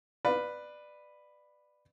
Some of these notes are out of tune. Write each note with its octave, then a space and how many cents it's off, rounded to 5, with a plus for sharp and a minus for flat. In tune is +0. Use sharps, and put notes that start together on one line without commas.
B4 +0 D5 +20 F5 +0